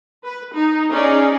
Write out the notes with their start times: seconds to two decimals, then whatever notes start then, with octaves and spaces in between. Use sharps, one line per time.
0.24 B4
0.53 D#4
0.90 C#4 D#4 G#4 D5